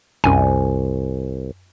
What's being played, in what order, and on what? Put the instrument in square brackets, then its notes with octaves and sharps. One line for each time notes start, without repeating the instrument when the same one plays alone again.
[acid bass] C2 [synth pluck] F#2 G#5